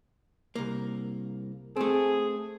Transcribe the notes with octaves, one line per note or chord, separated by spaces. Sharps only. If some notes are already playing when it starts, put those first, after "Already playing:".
C2 A#3
A3 C4 G#4